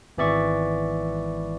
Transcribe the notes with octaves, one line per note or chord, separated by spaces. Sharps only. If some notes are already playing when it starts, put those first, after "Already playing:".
G#1 E3 B3 D5 E5 C#6